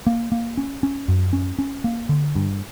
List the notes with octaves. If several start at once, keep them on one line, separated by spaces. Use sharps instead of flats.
A#3
A#3
C#4
C#4
F#2
C#4
C#4
A#3
D3
G2